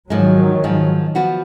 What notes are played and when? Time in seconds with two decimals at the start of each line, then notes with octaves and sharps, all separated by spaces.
0.10 G#2 D#3 F3 F#3 G#3
0.64 G#2 F3 G#3
1.15 F3 B3 F#4